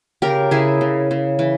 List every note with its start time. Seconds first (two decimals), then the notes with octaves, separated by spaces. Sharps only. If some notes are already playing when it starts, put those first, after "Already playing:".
0.22 C#3 G4 A#4
0.51 C#3 E4 G#4
0.81 C#3
1.11 C#3
1.39 E3